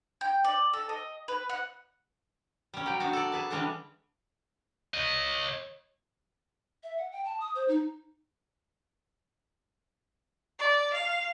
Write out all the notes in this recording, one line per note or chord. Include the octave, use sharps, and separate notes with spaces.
G5
D5
A4
D#5
B4
F#5
G3 C#4
F#3 G5
B3 D4 F#4
A4 D5
G#4 B4 A5
D3 E3 G3 G#3 C#4 D4
C#5 D#5
E5
F#5
G5
A5
D#6
C5
D#4
D5
F5